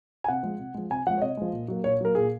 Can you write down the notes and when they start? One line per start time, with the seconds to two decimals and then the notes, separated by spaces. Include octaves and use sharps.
0.24 G#5
0.28 C3 F#5
0.43 F3 G#3
0.59 C3
0.74 F3 G#3
0.90 C3 G#5
1.07 F3 G#3 F#5
1.18 C#5
1.22 C3 D#5
1.37 F3 G#3
1.52 A#2
1.68 F#3 A#3
1.84 A#2 C#5
2.01 F#3 A#3 A#4
2.15 A#2 G#4